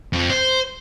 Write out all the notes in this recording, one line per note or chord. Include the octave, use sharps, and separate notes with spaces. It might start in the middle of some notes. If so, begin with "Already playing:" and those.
F2
C5